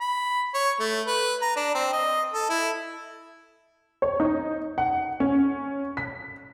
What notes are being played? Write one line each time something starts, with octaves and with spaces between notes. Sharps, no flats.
B5
C#5
A3
B4
A#5
D4
C4
D#5
A4
E4
C#5
D#4
F#5
C#4
B6